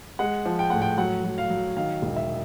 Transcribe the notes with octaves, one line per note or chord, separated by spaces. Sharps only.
G#3 F#5
F3
G5
A2 F#5
G5
F#3 F#5
F#3
F5
F#3
D#3 F5
E1
E5